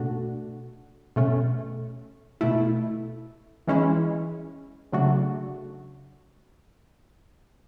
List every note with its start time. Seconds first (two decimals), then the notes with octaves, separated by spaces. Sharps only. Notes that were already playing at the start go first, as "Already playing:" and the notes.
Already playing: B2 A3 D4 F#4
1.16 B2 A3 C#4
2.41 B2 A3 E4
3.67 E3 G#3 C#4 E4
4.92 C#3 F#3 A3 D4 F#4